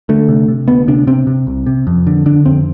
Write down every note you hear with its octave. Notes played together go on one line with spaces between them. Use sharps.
D3 A3
C3
C3
D2 B3
C3 D4
C3 C4
C3
C2
C3
F2
D3
D3 D4
F2 C4